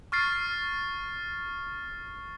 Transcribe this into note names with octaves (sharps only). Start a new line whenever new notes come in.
C#6 F6 A6 C7